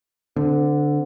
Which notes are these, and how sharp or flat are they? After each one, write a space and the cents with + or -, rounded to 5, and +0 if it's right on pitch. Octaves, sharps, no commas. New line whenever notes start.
D3 +0 C4 -30